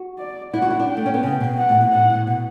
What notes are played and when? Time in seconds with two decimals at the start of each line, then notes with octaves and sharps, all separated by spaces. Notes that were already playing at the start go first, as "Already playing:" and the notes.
Already playing: F#4
0.18 D5
0.54 E4 F#5
0.62 F#4
0.70 E4
0.79 D4
0.89 G5
0.97 A3
1.06 C#4
1.14 B3
1.23 C#3
1.40 B2
1.58 F#5
1.69 A2
1.81 B2
1.92 A2 F#5
2.10 A2
2.27 B2